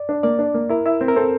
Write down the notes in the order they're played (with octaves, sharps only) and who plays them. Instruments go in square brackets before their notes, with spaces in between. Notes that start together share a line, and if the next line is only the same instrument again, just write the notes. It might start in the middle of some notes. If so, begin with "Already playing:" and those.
Already playing: [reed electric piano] D5
[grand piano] D4
[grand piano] A#3 [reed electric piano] D5
[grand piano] D4
A#3
[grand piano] E4 [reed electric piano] A#4
[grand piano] E4
C4
[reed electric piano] A#4
[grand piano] C4 [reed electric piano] A4